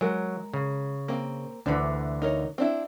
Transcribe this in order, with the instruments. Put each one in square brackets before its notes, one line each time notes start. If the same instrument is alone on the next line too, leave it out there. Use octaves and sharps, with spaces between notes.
[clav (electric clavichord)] F#3 [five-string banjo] G#3 A#4
[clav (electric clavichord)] C#3
[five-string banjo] A#3 C4
[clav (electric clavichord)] D2 D3 E3 [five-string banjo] D4 B5
[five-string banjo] D#4 A#4 C#5
C4 D4 E4